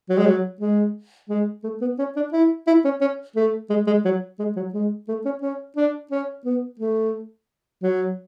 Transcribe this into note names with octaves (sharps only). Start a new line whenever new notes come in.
F#3
G#3
F#3
G#3
G#3
A3
B3
C#4
D4
E4
E4
C#4
C#4
A3
G#3
G#3
F#3
G#3
F#3
G#3
A3
C#4
C#4
D4
C#4
B3
A3
F#3